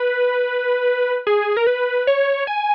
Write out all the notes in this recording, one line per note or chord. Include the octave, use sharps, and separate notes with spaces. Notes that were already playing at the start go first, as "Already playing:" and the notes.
Already playing: B4
G#4
A#4
B4
C#5
G#5